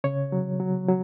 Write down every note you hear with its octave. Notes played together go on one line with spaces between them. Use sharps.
C#3 C#5
F#3
F#3
F#3